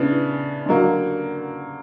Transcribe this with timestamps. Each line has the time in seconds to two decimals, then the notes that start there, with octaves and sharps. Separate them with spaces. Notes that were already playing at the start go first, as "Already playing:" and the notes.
Already playing: C#3 E3 B3 D4
0.66 D3 F#3 A#3